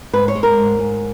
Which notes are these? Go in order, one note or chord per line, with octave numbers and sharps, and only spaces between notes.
G#2 B4
C#5
G#3
A#4
G#2
G#2